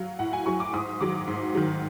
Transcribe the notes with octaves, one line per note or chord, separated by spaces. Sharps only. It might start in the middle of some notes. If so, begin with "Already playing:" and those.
Already playing: F#3 F5
A2 F#5
G#5
F#3 C#6
D6
G#2 D#6
D#3 F#3 D6
G#2
D#3 F#3